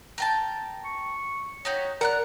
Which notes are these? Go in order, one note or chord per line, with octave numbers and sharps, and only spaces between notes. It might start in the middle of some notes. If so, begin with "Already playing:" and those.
A#4 G5 A5
C#6
D#4 F#4 G4 C#5
A#4 D5 F#5 A#5 F#6